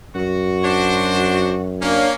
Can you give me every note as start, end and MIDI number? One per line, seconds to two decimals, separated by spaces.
0.16 2.03 42
0.16 1.73 66
0.64 1.53 62
0.64 1.53 72
1.82 2.13 58
1.82 2.13 61
1.82 2.10 62
1.82 2.10 73
1.82 2.10 77